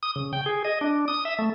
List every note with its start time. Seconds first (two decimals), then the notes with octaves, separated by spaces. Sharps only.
0.03 D#6
0.16 C#3
0.33 G5
0.46 G#4
0.65 D#5
0.81 D4
1.08 D#6
1.25 E5
1.39 A3